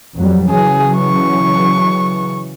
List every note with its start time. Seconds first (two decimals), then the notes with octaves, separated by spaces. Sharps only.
0.17 F2 F#3 G3
0.50 C#3 E3 F#3 G#4
0.97 C#6